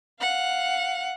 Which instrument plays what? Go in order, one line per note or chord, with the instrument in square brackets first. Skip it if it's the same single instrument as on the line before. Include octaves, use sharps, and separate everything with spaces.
[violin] F5 F#5